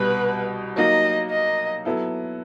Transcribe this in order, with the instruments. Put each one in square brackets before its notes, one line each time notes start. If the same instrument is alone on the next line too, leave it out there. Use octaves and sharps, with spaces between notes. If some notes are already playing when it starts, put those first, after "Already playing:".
Already playing: [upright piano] C2 B2 G3 [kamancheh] B4
[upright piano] F#3 A#3 D#4 F#4 [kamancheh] D#5
[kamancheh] D#5
[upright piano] F#3 B3 E4 A4